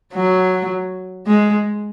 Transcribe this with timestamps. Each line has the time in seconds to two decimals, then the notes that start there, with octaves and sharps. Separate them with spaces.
0.14 F#3
1.27 G#3